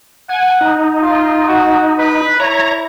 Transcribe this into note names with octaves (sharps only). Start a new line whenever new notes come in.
F#5 G#5
D#4
F4
F#4
B4
E4 C#5 A#5